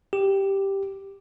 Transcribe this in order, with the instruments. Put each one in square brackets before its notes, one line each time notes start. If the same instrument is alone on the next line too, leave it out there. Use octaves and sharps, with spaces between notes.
[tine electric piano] G4